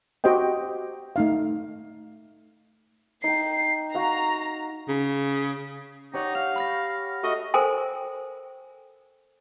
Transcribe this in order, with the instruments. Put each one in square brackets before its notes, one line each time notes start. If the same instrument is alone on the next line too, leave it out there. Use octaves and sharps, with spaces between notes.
[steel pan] F#4 G4 C5 D#5 G5
A3 D#4 F5
[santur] D#4 G5 [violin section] C7
[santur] F#4 F5 F#5 [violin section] A#5
[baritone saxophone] C#3
[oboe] D#4 [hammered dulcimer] G4 C#5 F#5
[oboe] F5 [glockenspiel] F7
[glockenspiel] B5 F6 A#6
[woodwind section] A3 F#4 D#5
[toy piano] A4 A#4 C5 G5 G#5